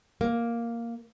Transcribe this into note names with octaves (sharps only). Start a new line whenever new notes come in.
A#3